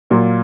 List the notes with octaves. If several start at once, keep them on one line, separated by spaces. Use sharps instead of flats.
A#2 F#3 A#3 F4